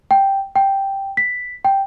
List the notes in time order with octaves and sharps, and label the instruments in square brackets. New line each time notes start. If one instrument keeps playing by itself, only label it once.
[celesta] G5
G5
B6
G5